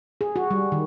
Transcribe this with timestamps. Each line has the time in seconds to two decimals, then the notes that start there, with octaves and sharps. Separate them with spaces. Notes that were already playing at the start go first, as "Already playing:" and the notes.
0.21 G#4
0.36 F#4
0.51 G3
0.72 D#3